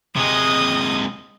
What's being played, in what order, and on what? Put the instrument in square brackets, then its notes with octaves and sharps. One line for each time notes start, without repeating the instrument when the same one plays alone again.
[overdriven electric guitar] C3 G#3 [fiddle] D#5 D#6